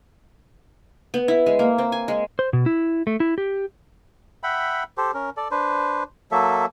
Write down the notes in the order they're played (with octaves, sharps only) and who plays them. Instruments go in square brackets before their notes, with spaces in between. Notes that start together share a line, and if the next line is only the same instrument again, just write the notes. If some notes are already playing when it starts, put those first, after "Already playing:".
[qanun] B3
E4
G#3
A#3
C4
G#5
G#3
[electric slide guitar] C5
B2
E4
A3
E4
G4
[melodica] E5 F#5 G5 B5
G4 A4 C5
C#4 A#4
A4 D5
D4 B4 C5
F#3 A#3 A4 E5